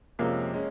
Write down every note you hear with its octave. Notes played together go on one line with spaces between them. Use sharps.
F2 C3 F3 G#3 A#3 C#4
G#3 C#4